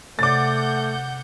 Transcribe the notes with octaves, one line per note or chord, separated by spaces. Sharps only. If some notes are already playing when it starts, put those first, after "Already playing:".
C3 A3 D5 F#5 D6 G6 A6